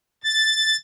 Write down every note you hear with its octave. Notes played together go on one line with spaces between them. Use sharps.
A6